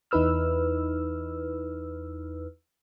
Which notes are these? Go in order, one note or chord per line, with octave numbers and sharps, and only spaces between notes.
E2 D#4 E4 B4 E6 F6